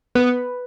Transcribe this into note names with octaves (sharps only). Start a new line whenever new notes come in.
B3 B4